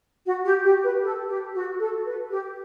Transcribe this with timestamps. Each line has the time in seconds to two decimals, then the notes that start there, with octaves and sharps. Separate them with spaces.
0.25 F#4
0.44 G4
0.63 G4
0.83 B4
1.03 A4
1.28 G4
1.54 F#4
1.79 A4
2.05 B4
2.31 G4